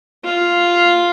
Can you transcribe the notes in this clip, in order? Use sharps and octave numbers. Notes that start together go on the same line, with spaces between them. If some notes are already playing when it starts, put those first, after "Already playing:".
F4